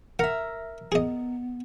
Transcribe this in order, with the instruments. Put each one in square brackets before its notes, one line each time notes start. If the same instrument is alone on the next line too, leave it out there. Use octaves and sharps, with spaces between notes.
[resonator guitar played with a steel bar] A#4 E5 [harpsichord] F#5
[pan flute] B3 [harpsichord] G#4 D#5